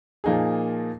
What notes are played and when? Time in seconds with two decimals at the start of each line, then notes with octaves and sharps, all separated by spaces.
0.24 A#2 F3 A#3 D#4 G#4